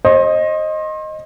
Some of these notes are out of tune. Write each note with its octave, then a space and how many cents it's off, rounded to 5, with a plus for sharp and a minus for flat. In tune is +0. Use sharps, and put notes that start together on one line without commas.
C5 +35 D#5 +0